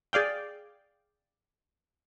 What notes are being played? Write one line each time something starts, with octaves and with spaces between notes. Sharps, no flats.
G#4 D5 F5 G5